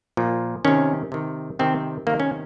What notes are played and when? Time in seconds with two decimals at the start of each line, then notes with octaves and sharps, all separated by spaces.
0.17 A#2 F3
0.65 C3 D#3 C#4
1.12 C3 D#3
1.59 C3 D#3 C4
2.07 C3 D#3 A#3
2.20 C#4